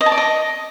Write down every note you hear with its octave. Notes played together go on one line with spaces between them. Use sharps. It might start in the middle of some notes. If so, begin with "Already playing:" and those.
D#5
A5
D5
D#5